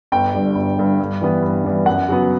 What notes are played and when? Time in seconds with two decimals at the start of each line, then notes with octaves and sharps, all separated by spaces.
0.12 G1 G5
0.34 G2 D3 G3
0.55 G1
0.78 G2 D3 G3
0.99 G2
1.21 E3 G3 B3
1.42 G2
1.65 E3 G3 B3
1.86 F#2 F#5
2.09 C#3 F#3 B3